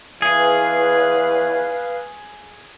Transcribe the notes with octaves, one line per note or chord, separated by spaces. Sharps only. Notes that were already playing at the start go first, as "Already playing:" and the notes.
E2 G#4 B4 F5